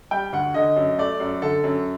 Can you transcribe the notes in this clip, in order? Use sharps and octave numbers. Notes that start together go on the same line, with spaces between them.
G3 G5
D2 F#5
D3 D#5
F#2
A3 D5
F#2
D3 A4
F#2